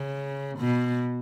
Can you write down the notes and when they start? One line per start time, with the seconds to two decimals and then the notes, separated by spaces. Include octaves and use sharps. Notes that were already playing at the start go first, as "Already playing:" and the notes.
Already playing: C#3
0.59 B2